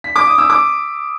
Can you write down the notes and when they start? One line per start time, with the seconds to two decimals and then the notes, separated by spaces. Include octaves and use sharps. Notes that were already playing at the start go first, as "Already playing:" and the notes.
0.04 B6
0.16 D6
0.27 D#6
0.38 E6
0.50 D6